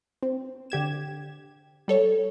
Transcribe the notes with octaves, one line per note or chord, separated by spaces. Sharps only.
C4
D3 G4 G#6 E7
G3 A4 C#5